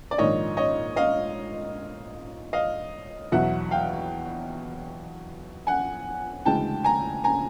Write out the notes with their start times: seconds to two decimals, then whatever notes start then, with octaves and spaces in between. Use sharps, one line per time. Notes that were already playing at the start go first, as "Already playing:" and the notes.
0.11 D5
0.18 A#1 G#2 D#3 C#5 D#5
0.57 C#5 D#5
0.96 D#5 F5
2.53 D#5 F5
3.32 E2 B2 F#3 E5 F#5
3.71 F5 G5
5.67 F#5 G#5
6.45 D2 C#3 E3 G#3 G5 A5
6.84 G#5 A#5
7.24 G#5 A#5